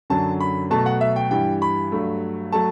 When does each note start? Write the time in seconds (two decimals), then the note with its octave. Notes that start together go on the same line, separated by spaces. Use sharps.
0.10 F#2 D3 F#3 A5
0.40 B5
0.70 B2 F#3 A3 A5
0.86 F#5
1.01 E5
1.16 G5
1.31 G2 E3 G3 G5
1.62 B5
1.92 G2 F#3 A3
2.52 F#3 A3 A5